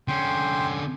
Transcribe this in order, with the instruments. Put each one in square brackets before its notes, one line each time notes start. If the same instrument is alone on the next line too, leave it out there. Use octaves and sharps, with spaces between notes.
[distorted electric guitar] D3 C#4 [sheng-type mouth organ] G5 C6